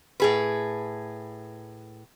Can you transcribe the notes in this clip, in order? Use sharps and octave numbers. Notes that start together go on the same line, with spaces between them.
A2 G#4 B4